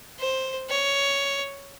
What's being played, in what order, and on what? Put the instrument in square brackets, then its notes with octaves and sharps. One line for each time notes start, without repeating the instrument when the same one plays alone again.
[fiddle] C5
C#5